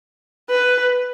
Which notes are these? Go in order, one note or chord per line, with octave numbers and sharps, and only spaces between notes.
B4